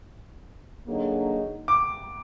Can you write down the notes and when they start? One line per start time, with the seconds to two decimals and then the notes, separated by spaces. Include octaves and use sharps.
0.86 D3 F#3 A#3 D#4 G#4
1.68 D6